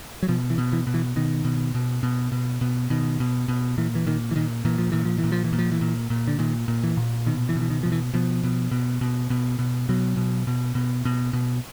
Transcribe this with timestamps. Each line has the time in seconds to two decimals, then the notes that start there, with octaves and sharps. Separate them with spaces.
0.23 F#3
0.28 B2 F3
0.50 E3
0.58 B2
0.73 E3
0.87 B2
0.94 E3
1.16 B2 D#3
1.45 B2
1.75 B2
2.03 B2
2.32 B2
2.61 B2
2.90 B2 D#3
3.20 B2
3.48 B2
3.78 A#2 E3
3.95 E3
4.06 A#2 D#3
4.31 E3
4.36 A#2 D#3
4.65 A#2 E3
4.78 F3
4.92 A#2 E3
5.05 F3
5.18 E3
5.24 A#2
5.32 F3
5.44 E3
5.53 A#2
5.59 F3
5.72 E3
5.81 A#2
6.10 A#2
6.27 D3
6.39 A#2 D#3
6.68 A#2
6.83 E3
6.97 A#2
7.26 B2 D#3
7.49 E3
7.56 B2
7.61 E3
7.70 D#3
7.83 B2 F3
7.92 E3
8.14 B2 F3
8.44 B2
8.71 B2
9.01 B2
9.30 B2
9.59 B2
9.89 B2 F#3
10.17 B2
10.47 B2
10.75 B2
11.05 B2
11.33 B2